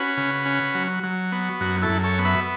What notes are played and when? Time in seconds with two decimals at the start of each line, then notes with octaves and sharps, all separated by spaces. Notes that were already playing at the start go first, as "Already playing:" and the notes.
Already playing: C#4 F#4 B4
0.17 C#3
0.46 C#4
0.75 F#3
1.03 F#3
1.32 B3
1.61 F#2 F#4
1.82 E4 A4
1.89 F#2
2.03 A4 C#5
2.18 B3
2.25 B4 E5